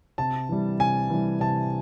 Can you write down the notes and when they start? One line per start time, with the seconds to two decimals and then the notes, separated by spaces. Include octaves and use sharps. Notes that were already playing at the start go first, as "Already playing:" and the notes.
0.18 C3 A5
0.49 E3 G3
0.79 C3 G#5
1.10 E3 G3
1.40 C3 A5